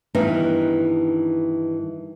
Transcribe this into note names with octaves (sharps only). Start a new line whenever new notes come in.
G2 D#3 E3 B3 D#4